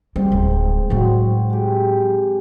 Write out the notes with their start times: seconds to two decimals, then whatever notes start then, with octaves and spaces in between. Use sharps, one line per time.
0.16 G#2 G3 C4
0.32 D1
0.90 A2 F#3 C4 F#4
1.50 G#3 G4